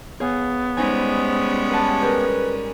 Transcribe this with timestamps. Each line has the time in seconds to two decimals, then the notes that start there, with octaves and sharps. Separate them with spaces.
0.20 B3 G#4 C#5 F5
0.77 G3 G#3 C#4 D#4 C5 G#5
1.71 B4 F#5 A5
2.02 G4 G#4 A#4 B4